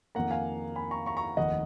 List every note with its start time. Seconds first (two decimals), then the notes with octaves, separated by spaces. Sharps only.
0.15 F2 D#3 A#3 F#5 A#5
0.31 F5 G#5
0.76 G#5 B5
0.91 A#5 C#6
1.06 A#5 C#6
1.17 A#5 C#6
1.37 F1 D#2 D#3 D#5 F#5